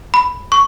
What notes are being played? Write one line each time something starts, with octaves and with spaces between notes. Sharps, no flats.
B5
C#6